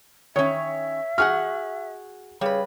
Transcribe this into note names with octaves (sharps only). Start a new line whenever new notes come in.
D#3 C#4 C#5 E5
F#4 G#4 F#5 F6
C#3 G3 B4